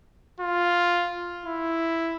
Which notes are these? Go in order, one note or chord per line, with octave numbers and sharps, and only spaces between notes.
F4
E4